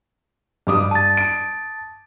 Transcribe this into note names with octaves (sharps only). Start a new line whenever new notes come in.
G2 D6 D#6
A5 A6
D7